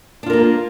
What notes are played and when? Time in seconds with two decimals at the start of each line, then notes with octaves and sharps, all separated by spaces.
0.23 D4
0.26 F4
0.30 A#4
0.33 A#3